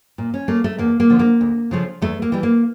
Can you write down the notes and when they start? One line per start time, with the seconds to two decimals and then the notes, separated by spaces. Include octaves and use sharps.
0.18 A#2
0.34 C#4
0.48 A3 A#3
0.64 A3
0.78 E2 A#3
1.00 A#3
1.10 D3 F3
1.19 A#3
1.41 D2
1.71 C#3 F3 A3
2.02 E2 A3
2.22 A#3
2.32 E3 G3
2.43 A#3